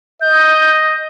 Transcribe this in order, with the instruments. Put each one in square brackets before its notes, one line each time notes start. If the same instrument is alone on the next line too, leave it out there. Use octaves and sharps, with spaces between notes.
[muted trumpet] D#5 [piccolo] G6